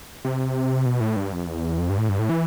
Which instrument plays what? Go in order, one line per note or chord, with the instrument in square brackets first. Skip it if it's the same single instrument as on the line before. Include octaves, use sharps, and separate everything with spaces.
[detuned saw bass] C3
B2
A2
G2
F2
E2
F2
G2
A2
G2
A2
E3